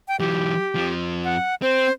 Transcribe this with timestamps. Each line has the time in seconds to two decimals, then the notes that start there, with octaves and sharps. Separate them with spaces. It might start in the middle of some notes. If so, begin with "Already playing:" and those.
0.08 G5
0.20 E3 F#3 G4
0.75 F2 F3
1.24 F#5
1.62 C4 C5